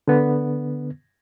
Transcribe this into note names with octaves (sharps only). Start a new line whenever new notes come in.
D3 B3